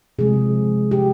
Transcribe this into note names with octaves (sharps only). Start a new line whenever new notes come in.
C3 F3 G#3 G#4
G4